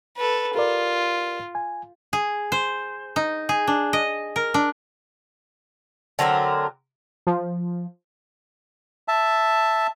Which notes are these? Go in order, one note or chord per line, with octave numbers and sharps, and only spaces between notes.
A4 B4
F4 G4 A#4 D5
G#5
G#4
C5
D#4
G#4
D4
D#5
A#4
D4
D3 F#3 C4 A#4
F3
E5 A5